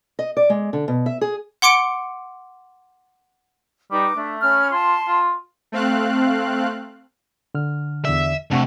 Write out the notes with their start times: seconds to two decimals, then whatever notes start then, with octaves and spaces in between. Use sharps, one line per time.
0.19 D#5
0.37 D5
0.50 G#3
0.73 D3
0.88 B2
1.06 E5
1.21 G#4
1.62 F#5 C6 D6 C#7 D7
3.91 G3 D#4 B4 D6
4.16 A3 D4 E5
4.41 C#4 B5 F6
4.72 F4 A5 C6
5.07 F4
5.72 A3 C4 F5 F#6
7.54 D3 F6
8.05 E2 D3 D5 E5
8.51 C3 A3 D4 F#5 C#6